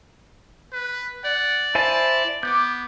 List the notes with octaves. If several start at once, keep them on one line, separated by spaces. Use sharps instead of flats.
B4
D5 F#5
E4 C5 G#5 A5
B3 D6 G6